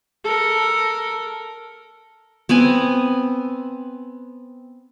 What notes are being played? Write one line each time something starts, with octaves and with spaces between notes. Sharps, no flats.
A4 A#4
B3 C4 F#5 G#5